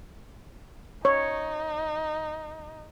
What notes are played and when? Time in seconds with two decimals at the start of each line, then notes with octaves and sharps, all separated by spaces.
1.05 D#4 C#5